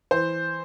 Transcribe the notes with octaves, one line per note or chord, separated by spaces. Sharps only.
E3 C5